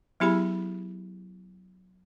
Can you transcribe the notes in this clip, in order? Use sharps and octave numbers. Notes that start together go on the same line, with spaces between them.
F#3 B3 E4 G4 G#4 B5